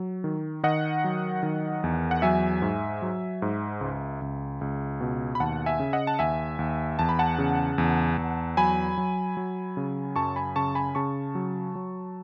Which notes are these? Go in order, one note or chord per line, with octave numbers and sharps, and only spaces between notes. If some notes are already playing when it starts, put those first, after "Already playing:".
Already playing: F#3
D#3
D#3 D#5 F#5
F#3
D#3
E2
F#5
F#3 E5 G#5
G#2
F#3
G#2
C#2
C#2
C#2
B2
B5
D#2 F#5 A5
E5 G#5
C#3
D#5 F#5
A5
D#2 E5 G#5
D#2
E2 A5
B5
F#5 A5
C#3
E2
E2
F#3 G#5 B5
F#3
F#3
C#3
F#2 A5 C#6
G#5 B5
C#3 A5 C#6
G#5 B5
C#3 A5 C#6
F#3
F#3